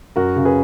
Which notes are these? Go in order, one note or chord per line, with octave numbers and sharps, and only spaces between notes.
F#2 F#4 A#4
C#3
G#4 B4